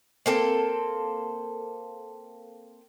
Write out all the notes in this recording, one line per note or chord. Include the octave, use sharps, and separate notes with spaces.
A#3 C4 A4